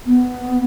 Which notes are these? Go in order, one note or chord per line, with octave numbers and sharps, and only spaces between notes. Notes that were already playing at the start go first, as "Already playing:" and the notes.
B3